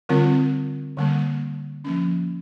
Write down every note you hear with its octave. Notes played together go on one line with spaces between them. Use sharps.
D3 G3 C4 F4 A#4
D3 G3 A#3
F3 A#3 C#4